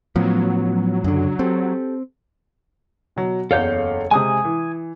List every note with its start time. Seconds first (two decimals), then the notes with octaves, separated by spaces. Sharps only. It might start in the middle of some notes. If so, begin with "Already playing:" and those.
0.16 A2 F3 F#3 A3 B3 C#4
1.04 C#2 F#2 D3 D4
1.39 C4 G4 A4
3.16 B2 F#3
3.51 F#1 E2 A4 C#5 F5 G6
4.11 C3 G#3 G#5 D#6
4.45 E3